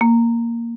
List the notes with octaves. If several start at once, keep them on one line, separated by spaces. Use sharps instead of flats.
A#3